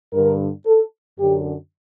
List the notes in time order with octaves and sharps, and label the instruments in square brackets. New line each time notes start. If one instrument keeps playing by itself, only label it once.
[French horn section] G2 D3 A#4
A4
F#2 D3 G4